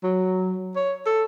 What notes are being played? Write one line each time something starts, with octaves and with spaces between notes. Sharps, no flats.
F#3
C#5
A4